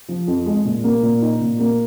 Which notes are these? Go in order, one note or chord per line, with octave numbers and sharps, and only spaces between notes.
F3
F2
G#3
A#2
A#3
A#2
D#4
A#2
A#3